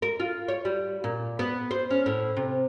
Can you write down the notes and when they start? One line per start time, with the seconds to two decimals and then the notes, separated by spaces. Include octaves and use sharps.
0.02 A#4
0.20 F4
0.48 C#5
0.65 G3
1.04 A#2
1.39 B3
1.71 C5
1.90 C#4
2.06 A2
2.37 C3